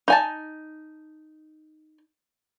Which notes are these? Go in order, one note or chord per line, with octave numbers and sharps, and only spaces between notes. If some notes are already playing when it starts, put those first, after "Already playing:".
D#4 G#5 A5